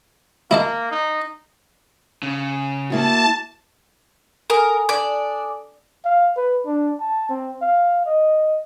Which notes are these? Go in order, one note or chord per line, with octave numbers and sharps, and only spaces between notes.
A#3 E4 D#5 A5
D#4
C#3
A#3 E4 F#4 A5
A4 A#4 G#5 D#6
D4 D5
F5
B4
D4
A5
C4
F5
D#5